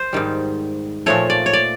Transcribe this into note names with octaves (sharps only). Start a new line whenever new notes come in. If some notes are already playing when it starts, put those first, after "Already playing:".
Already playing: C5
G#2 D#3 G3
A#2 F3 A3 C#5
D5
C#5
D5